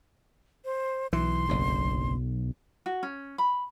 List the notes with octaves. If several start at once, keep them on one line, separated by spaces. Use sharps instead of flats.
C5
B1 E3 C6
F#1 D2
F#4
C#4
B5